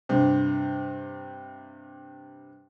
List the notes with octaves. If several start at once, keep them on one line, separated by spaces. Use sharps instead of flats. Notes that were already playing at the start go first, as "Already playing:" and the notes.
G2 C3